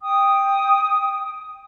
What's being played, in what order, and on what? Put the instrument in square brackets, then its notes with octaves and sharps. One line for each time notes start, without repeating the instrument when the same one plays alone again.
[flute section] G5 D#6